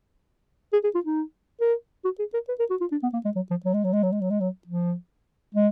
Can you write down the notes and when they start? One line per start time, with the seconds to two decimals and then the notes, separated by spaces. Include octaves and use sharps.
0.73 G#4
0.84 G#4
0.95 F4
1.05 D#4
1.60 A#4
2.04 F#4
2.19 G#4
2.34 A#4
2.48 B4
2.59 A#4
2.70 F#4
2.81 F4
2.92 D4
3.03 B3
3.13 A#3
3.25 G#3
3.36 F#3
3.50 F3
3.65 F#3
3.74 G#3
3.84 F#3
3.93 G#3
4.03 F#3
4.12 G#3
4.21 F#3
4.30 G#3
4.40 F#3
4.67 F3
5.55 G#3